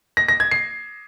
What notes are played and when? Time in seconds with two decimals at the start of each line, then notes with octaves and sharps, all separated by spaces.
0.17 A#6
0.28 A#6
0.40 G#6
0.51 C7